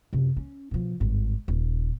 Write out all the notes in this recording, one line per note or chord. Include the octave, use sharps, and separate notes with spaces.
F#2 C3
C#4
B2 F3
G#1 G2
D#1